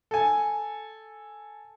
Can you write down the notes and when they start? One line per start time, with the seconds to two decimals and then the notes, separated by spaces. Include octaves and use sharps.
0.11 A4 G#5